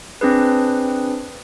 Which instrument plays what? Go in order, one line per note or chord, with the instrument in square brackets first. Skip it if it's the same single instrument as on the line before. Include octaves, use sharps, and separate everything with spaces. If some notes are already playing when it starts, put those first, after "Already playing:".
[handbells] C4 D4 G#4 B4